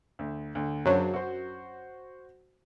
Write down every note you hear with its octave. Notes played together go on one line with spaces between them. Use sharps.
D2
D2
F#2 C#3 F#3 D4 C5
F#4 C5